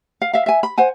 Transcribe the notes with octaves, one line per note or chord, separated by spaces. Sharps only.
F5
E5 F5
E5 G#5
B5
C5 F#5 G#5